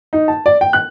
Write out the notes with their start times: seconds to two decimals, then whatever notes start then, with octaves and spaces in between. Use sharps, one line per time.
0.13 D#4
0.28 A5
0.46 D5
0.61 G5
0.73 F#6